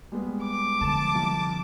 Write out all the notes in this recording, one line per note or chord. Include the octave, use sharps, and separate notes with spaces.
G3 G#3 B3
D6
D3 F3 A5
C2